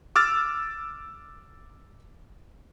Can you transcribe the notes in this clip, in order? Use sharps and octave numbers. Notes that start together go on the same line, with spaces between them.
D6 E6 F6 A6